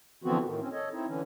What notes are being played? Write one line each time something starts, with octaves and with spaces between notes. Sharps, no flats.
D3 E3 F3 B3 C4 F#4
A2 D#3
C4 C#4
A4 C#5 D#5
C4 D#4 E4
D3 E3 C#4